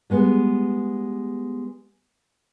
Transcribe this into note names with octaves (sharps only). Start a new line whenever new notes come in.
G3 G#3 B3